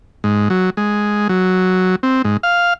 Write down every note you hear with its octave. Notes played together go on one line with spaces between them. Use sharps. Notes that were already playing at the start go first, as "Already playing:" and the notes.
G#2
F#3
G#3
F#3
C4
G#2
F5